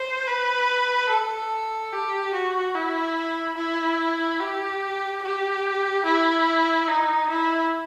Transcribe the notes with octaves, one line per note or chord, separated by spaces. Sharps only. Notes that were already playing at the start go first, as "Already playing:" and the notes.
Already playing: C5
B4
A4
G4
F#4
E4
E4
G4
G4
E4
D#4
E4